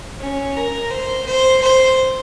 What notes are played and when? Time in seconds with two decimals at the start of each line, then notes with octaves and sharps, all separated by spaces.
0.20 C#4
0.56 A#4
0.90 C5
1.26 C5
1.61 C5